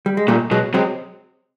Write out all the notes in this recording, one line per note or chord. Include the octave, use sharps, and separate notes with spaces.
G3
G#3
A#2 G3 A3
B2 F#3 G#3
C3 F#3 G#3